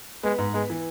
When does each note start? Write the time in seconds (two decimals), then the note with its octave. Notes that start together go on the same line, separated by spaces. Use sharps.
0.23 G#3 B3
0.38 G#2
0.54 G#3 B3
0.70 E3